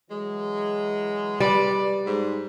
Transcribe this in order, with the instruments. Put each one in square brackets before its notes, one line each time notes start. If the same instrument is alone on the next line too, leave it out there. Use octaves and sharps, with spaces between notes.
[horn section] E3 F#3 G#3
[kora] G3 [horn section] B4 D5
[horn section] G#2